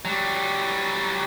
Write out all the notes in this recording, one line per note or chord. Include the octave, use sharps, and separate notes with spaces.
F#3 G3